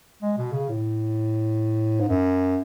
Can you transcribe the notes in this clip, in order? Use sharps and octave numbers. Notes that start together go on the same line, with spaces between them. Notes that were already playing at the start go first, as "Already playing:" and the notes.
G#3
B2
C#3
A2
G#2
F#2